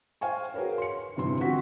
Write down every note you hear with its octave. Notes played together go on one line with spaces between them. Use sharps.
C5 F5 G5 G#5 C#6
F#4 G#4 A#4 B4 C#5
C6 C#7
G1 G2 C3 E3 C6
C4 F4 F#4 F#5 C#6 B6